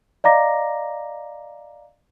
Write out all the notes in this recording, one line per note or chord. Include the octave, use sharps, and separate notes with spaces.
D5 D#5 F5 A#5 D6 A#6